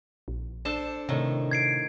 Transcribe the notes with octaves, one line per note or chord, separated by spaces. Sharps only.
A#1
D4 A4 C5 A5
A2 C3 D#3
G#6 C7 D7